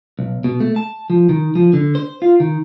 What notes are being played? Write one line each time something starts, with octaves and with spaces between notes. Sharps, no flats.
B1
B2
A3
A5
F3
D#3
F3
D3
C5
F4
D#3